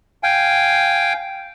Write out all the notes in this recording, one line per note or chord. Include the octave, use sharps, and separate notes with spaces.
F5 G5 G#5